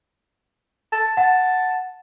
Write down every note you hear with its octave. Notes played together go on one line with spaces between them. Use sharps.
A5
F#5 A5